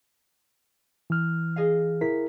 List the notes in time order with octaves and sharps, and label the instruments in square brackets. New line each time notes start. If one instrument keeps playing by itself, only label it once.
[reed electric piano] E3 F6
[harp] G#4 D#5 F5
[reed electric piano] E4 A#4 [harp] B6